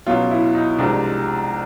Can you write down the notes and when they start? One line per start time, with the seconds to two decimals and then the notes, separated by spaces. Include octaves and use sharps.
0.07 C#2 B2 F#3 F4
0.31 E4
0.55 D#4
0.78 C2 C3 F3 G#3 D4